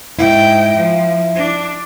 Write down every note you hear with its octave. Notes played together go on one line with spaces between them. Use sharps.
G#2 E4 G5
F3
D4